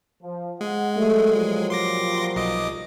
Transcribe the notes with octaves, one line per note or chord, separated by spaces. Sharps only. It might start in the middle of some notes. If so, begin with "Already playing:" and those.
F3
G#3 F#5
A#2 F#3 G3 A3
F3
C6 D6 A#6
B1 D#5 D6